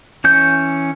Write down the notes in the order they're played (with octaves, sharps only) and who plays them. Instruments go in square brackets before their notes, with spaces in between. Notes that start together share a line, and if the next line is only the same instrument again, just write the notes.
[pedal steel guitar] E3 C#4 G6